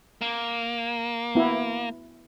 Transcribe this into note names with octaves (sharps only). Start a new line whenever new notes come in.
A#3
B3 E4